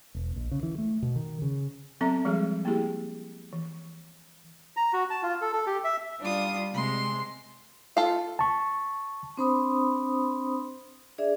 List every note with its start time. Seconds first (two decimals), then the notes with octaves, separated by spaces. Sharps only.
0.15 E1
0.36 A#1
0.51 C#3
0.63 E3
0.78 A3
1.02 B2
1.16 D#3
1.42 C#3
2.01 F#3 B3 C4 A4 E5 A#5
2.25 F3 G3 G#3 G#4
2.65 A#3 B3 E4 G4 G#4
3.53 E3
4.77 A#5
4.93 F#4
5.10 A5
5.23 F4
5.41 A4
5.53 A4
5.67 G4
5.84 E5
6.20 G3 D4 F4 D#6
6.74 C3 G#3 C6
7.97 F4 A4 F5
8.39 A5 C#6
9.37 C4 D4 C5 B5 C6 D#6
11.18 D4 G#4 D5 E5